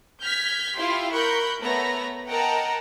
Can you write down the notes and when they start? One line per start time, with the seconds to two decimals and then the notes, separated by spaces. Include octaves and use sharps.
0.22 F6 G6 G#6 B6
0.78 E4 F4 G4 E5 F5 C6
1.13 A#4 B5 C#6 F#6 G6
1.61 A3 B3 C#5 A#5 B5
2.28 A#4 D#5 F#5 G5 A5 A#5